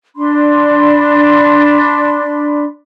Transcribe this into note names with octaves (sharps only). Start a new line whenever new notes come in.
D4 B5 C6